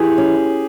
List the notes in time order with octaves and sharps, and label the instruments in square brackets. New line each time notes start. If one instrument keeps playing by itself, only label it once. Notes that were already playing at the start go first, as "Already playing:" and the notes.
Already playing: [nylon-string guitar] E3 [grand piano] G4 G#4
[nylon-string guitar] C#4